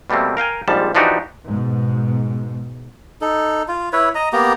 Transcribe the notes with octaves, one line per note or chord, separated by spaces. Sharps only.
B2 G3 A3 A#3 C4
A#4 F5 G5 G#5
A#1 G#2 F3 G3 A5
E3 F3 D4 D#4 F#4 G4
G#2 B2
D#4 A4
F4
E4 B4 C#5
D#5 A#5
A#3 B3 G4 A#5